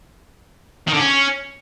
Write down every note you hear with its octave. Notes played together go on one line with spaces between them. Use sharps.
D#3
D3
C#4